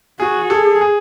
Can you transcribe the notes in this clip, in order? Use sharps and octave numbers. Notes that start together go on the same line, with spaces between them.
F#4 G#4
G#4 A4
G#4